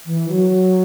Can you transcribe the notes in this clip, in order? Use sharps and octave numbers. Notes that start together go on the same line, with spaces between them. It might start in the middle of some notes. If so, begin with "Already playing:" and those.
E3
F#3